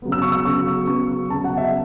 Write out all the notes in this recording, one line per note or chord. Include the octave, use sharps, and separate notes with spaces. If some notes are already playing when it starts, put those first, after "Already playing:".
C#3 F#3 B3
E6
C#6
E6
C#3 F#3 B3 C#6
C#3 F#3 B3 C#6
C#3 F#3 B3 A5
F#5
E5